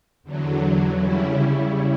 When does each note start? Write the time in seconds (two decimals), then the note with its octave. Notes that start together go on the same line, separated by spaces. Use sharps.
0.23 E2 D3 F#3
1.00 C#3 G3 C#4 E4